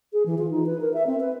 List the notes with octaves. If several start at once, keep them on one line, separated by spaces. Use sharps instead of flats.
G#4
E3
F4
D#4
B4
A#4
E5
C4
B4